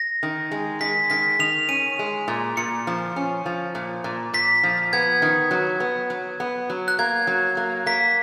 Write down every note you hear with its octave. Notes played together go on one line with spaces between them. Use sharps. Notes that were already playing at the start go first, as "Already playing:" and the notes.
Already playing: A#6
D#3
G#3
G#3 B6
D#3 B6
D#3 F7
C#4 D#7
G#3
A#2
A#2 C#7
F3
C#4
F3
A#2
A#2
A#2 B6
F3
B3 G#6
D#3
F#3
B3
F#3
B3
F#3
F#6
A#3 G#6
F#3
A#3
A#3 B6